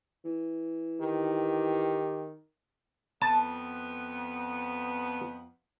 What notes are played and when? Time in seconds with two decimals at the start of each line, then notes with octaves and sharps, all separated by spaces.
0.25 E3
1.01 D#3 G4
3.22 F2 B3 A5